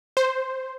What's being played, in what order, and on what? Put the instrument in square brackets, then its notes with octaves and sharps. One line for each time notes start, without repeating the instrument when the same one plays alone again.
[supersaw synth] C5